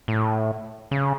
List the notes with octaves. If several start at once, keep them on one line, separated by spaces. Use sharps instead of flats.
A2
C#3